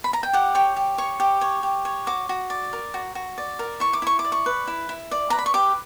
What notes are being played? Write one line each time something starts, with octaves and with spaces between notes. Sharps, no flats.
B5
A#5
G5
G4 F#5
C#5 G5
G4
C#5 C#6
G4
C#5
G4
C#5
F#4 D6
F#4
D5
A#4
F#4
F#4
D5
A#4
E4 C#6
D6
E4 C#6
D6
D5
C#6
B4
E4
E4
D5
B4 A#5
B5
C#6
G4 D6